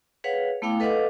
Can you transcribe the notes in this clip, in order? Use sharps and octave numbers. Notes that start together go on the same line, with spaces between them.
G#4 B4 C#5 F5 F#5
A3 B3 E4 F5 G5 D6
A4 B4 D#5 F5 F#5 D6